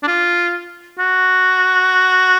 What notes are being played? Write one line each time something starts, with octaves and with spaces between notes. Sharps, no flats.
D4
F4
F#4